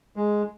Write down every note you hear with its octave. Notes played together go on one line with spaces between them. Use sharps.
G#3